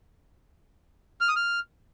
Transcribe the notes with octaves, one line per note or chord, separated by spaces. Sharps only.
F6
D#6
F6